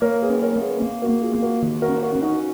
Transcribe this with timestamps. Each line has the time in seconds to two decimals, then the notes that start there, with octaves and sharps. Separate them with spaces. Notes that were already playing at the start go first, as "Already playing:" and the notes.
0.02 A#3 A#4 C#5
0.22 G#4 B4
0.29 C#4
0.42 A#4 C#5
0.56 A#3
0.61 G#4 B4
0.82 A#3
1.02 F#4 A#4
1.09 A#3
1.22 F4 G#4
1.35 A#3
1.42 F#4 A#4
1.62 D#3
1.82 F#4 A#4
1.88 C#4
2.02 F#4 A#4
2.15 C#4
2.21 D#4 F#4